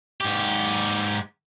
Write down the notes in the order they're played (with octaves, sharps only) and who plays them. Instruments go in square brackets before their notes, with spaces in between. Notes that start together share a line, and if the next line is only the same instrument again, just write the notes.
[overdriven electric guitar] G#2 G4